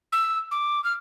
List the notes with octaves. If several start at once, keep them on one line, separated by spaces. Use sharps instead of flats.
E6
D6
F6